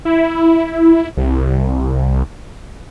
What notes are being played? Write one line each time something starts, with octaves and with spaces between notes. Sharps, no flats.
E4
C2